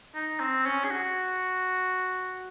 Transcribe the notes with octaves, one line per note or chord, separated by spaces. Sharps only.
D#4
C4
C#4
G#4
F#4